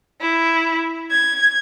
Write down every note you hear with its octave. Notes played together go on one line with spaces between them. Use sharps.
E4
G#6